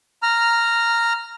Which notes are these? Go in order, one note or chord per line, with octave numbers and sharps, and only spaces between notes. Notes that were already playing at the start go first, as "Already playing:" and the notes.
A#5 F6